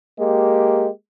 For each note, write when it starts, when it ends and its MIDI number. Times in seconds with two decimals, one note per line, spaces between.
0.20 0.88 56
0.20 0.88 58
0.20 0.88 67